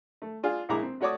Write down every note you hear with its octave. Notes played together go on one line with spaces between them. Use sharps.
A3
D4 F4 G#4
A#1 G#3 E4 A#5 D6
C4
A3 F#4 C#5 D5 D6 D#6